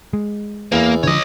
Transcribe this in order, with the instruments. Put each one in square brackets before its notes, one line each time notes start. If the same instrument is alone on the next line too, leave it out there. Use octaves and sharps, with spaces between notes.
[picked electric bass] G#3
[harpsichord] E2 [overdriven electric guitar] A#3
[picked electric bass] D3 F3 [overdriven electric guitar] C#5 D#5